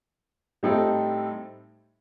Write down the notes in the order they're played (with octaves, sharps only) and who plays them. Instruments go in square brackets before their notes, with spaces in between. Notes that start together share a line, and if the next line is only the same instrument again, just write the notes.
[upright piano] A2 G3 C4 D#4 A4